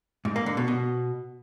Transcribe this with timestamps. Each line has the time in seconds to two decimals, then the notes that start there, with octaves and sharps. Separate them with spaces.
0.25 G#2
0.36 A#3
0.46 D3
0.57 B2
0.68 B2